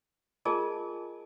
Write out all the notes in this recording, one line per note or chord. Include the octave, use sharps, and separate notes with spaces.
F4 G#4 A#4 D#5 G#5 A5